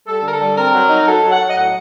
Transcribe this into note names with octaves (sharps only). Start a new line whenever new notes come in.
G3 A4
D3 A#4
A4
G3
C4 A#4
F#3
D#4
F#3 A4
F#3
F#5
F#3
D#5
A2 F#5